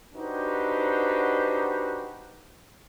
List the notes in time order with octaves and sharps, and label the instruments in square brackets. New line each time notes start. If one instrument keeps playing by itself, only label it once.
[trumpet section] D4 D#4 F#4 G4 B4 C5